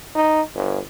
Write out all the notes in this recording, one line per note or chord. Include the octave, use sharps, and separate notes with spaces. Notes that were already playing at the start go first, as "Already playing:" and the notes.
D#4
G1